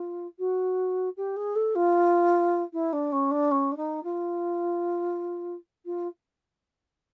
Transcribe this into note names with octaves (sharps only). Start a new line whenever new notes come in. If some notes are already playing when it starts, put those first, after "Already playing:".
Already playing: F4
F#4
G4
G#4
A4
F4
E4
D4
C#4
D4
C#4
D4
D#4
F4
F4